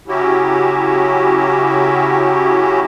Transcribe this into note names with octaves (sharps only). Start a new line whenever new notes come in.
C#3 F#3 C#4 E4 F#4 G4